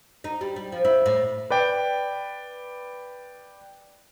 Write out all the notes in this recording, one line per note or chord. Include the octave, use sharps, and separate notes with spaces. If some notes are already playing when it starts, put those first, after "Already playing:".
D#4
G3
G3
F3
E4
A2
B4 D5 G5